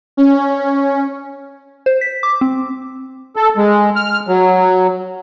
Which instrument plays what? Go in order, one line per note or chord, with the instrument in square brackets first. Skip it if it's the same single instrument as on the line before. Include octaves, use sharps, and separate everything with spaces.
[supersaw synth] C#4
[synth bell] C5
B6
D6
C4
[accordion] A4
G#3
F6
F#3